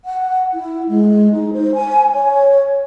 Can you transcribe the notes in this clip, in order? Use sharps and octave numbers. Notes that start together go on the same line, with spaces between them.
F#5
E4
G#3
D#4
C5
G#5
C#5